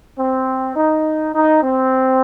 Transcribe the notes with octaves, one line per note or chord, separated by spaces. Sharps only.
C4
D#4
D#4
C4